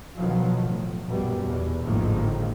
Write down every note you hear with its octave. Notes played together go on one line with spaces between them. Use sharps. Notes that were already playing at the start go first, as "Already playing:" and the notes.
B2 D#3 F3 F#3
A2
A#1 F#2 B2 G3
E2 B2
G#1 A2 D3 D#3 F3 A#3